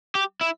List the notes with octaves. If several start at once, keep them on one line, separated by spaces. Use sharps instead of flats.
G4
E4